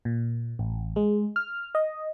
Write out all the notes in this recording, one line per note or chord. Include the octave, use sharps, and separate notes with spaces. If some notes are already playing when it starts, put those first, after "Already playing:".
A#2
A1
G#3
F6
D#5